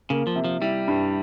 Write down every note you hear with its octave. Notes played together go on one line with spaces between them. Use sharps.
C#3 A#3
F3
C3
F3
G3 E4
G2